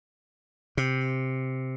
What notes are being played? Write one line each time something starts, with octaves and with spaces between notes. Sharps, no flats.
C3